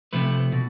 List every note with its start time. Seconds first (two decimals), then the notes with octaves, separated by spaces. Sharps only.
0.13 C3 F3 A3 B4
0.52 B2